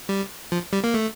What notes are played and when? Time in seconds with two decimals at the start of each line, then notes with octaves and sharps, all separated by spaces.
0.09 G3
0.52 F3
0.73 G3
0.84 A#3
0.94 A3